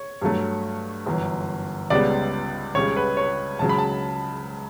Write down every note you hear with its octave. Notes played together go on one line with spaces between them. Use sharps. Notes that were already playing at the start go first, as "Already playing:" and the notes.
Already playing: C#5
G2 F#3 A3
G1 F#2 E3
C#2 C#3 G3 B3 D5
C#2 C#3 G3 C#5
B4
C#5
C#2 C#3 F#3 A5
B5
A5